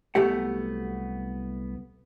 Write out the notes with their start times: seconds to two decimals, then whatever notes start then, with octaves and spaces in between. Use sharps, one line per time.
0.15 C2 F#3 A3 B3 G4 F#5